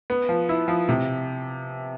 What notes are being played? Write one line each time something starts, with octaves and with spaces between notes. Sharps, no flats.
B3
F3
E4
F3
C3